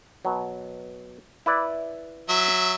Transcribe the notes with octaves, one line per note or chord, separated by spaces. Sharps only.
B2 F#3
E4 B4 D5
F#3 E5